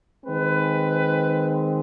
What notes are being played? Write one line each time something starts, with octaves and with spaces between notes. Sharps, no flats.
D#3 G#3 C4 B4